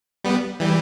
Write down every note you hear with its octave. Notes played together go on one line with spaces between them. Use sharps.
G3 B3
E3 G3